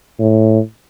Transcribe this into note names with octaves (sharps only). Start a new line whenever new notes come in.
A2